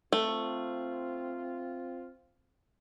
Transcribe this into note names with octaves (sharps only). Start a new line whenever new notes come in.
A3 C4 F4 A4